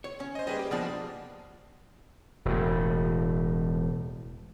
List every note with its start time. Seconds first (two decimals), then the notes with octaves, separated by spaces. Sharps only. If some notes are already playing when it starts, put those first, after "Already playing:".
0.04 C#5
0.20 C#4
0.35 C5 D#5
0.47 G3 A#3 G#4 B4 D#5
0.59 G4
0.71 B2 F3 A#3 D4 G#4
2.45 E1 A2